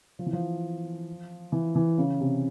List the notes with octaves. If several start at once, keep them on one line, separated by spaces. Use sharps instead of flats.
F3
E3
F3
E3
E3
C#3
C3